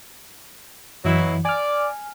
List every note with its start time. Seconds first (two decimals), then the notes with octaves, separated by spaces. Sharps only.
1.05 F#2 B2 E3 F#3 E4
1.45 D5 G#5 F6